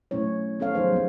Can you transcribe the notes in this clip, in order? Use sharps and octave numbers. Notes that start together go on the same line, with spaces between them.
B2 F#3 A3 C#4 E4 C#5
B3 C#4 A4 C#5 F5
F3 F#3 D#4 G#4 C5
G3 B3